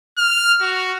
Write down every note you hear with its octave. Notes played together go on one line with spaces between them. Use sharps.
F6
F#4